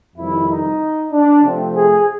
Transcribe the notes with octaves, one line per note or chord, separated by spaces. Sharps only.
F2 C3 D#3 G3 E4
D#4
D4
C3 F3 A3 C4
G#4